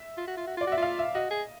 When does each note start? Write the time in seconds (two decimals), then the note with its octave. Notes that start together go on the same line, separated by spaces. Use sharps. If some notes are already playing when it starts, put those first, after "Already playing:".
Already playing: E5
0.17 F4
0.27 F#4
0.37 F4
0.47 F#4
0.57 F4 D5
0.67 F#4 E5
0.77 F4
0.82 F5
0.99 E5
1.14 F#4 D#5
1.31 G#4